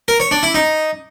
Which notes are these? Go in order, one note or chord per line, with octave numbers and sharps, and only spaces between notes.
A#4
C#5
D4
E4
D#4